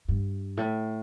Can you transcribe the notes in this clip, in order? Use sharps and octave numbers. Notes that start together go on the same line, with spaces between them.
G2
A2